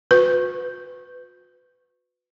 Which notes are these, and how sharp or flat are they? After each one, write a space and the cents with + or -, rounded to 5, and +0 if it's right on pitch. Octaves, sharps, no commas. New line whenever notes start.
F#4 -40 B4 +20